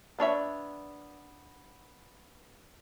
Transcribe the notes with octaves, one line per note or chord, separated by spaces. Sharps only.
B3 D4 C#5 E5